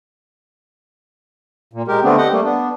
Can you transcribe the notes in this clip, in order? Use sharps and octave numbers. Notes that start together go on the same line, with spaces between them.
A#2
G#3 G4 A#4
D3 A3 B3 C4 D4
G4 D#5 F#5
G3 A3 A#3
B3 D4